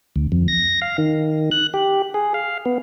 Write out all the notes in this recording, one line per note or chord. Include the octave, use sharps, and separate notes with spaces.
D2
F2
A#6
F5
D#3
F#6
G4
G#4
F5
B3